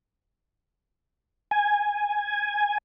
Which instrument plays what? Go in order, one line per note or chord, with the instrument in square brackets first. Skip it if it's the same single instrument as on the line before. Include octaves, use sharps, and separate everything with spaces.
[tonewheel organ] G#5